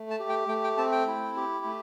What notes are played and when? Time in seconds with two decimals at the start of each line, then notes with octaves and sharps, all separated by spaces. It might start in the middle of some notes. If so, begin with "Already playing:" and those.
Already playing: A3
0.10 A5
0.19 G4
0.29 G5
0.48 A3 G5
0.64 G5
0.78 C4 A5
0.92 G5
1.07 E4
1.37 G4
1.65 A3